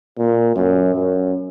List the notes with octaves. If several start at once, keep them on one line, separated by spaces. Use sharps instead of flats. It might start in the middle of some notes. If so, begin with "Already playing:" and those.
A#2
F#2
F#2